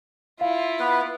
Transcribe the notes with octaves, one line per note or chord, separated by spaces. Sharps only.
E4 F4 F5
B3 B4